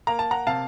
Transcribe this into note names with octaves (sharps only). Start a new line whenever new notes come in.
A#3 A#5
A5
F#5 A#5
C3 F5 A5